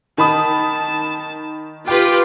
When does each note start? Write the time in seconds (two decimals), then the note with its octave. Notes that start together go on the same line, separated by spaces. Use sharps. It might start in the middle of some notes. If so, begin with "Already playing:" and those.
0.18 D#3 A5 B5 D#6
1.88 F4 G4 B4 G5 D6